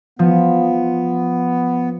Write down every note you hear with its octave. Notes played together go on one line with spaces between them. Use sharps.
F3 B3